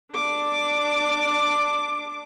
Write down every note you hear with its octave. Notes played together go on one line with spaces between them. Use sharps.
D4 D6